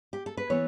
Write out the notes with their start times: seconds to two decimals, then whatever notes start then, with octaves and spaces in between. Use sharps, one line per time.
0.13 G4
0.26 A4
0.37 B4
0.50 E3 B3 C#5